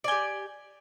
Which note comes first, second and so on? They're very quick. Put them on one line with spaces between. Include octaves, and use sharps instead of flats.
D5 G#5 G4